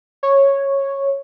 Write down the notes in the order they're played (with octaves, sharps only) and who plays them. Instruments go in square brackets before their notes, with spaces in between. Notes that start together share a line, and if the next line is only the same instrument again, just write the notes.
[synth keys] C#5